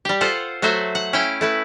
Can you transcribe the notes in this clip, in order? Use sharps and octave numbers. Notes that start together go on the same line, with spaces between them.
G3 G4
F4 A4 C5 F#5
F#3 A3 F#4 C5 E5
F#5
C#4 E4 F5 G5
A3 E4 B4